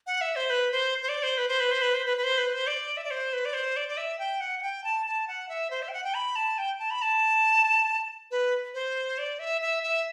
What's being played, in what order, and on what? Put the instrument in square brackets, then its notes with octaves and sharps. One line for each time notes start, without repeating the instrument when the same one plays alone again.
[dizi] F#5
E5
C5
B4
C5
C5
D5
C5
B4
C5
B4
C5
B4
C5
B4
B4
C5
B4
C5
D5
E5
D5
C5
B4
D5
C5
D5
D5
E5
G5
F#5
F#5
G5
A5
A5
F#5
E5
C5
E5
G5
F#5
G5
B5
A5
G5
A5
B5
A5
B4
C5
D5
E5
E5
E5